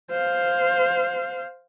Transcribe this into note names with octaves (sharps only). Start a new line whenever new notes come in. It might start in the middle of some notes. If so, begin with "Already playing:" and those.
C5 F5